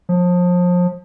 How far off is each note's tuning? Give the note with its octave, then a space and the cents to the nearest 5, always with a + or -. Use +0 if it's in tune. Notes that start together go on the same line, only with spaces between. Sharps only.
F3 +30